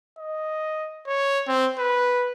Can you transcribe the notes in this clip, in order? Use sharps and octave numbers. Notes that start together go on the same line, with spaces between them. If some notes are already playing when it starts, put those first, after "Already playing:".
D#5
C#5
C4
B4